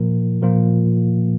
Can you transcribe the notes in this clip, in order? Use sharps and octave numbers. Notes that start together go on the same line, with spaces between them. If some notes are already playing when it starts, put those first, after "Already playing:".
Already playing: A#2 F3 A#3 F4 A#4
A#2 F3 A#3 F4 A#4